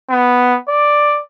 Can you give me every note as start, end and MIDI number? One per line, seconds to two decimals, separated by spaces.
0.10 0.57 59
0.69 1.22 74